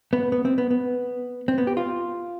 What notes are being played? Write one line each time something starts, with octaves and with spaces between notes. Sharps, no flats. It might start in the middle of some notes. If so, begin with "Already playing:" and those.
B3
B3
C4
B3
B3
C4
B3
G4
F4